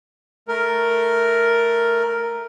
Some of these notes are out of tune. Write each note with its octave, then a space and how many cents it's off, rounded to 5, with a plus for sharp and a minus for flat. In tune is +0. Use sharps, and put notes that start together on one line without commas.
A3 +0 A#4 +0